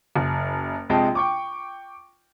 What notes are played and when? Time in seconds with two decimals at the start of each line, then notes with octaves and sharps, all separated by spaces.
0.16 F#1
0.89 A#1 C3 G#3 G5 A5
1.15 G5 C#6 D6